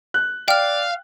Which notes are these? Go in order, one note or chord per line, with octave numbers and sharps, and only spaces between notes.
F#6
D5 F5 G5 F6